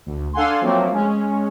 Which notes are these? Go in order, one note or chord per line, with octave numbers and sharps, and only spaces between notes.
D2
D4 A4 F5 F#5 G#5 C6
F3 F#3 A3 A#3 C4
G#3 C#4